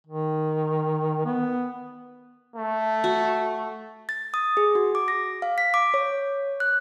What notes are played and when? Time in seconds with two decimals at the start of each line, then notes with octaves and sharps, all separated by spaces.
0.06 D#3
1.26 B3
2.56 A3
3.04 F#4
4.09 A6
4.34 D#6
4.57 G#4
4.75 F#4
4.95 D6
5.08 A#6
5.42 F5
5.58 B6
5.74 D6
5.94 C#5
6.60 F#6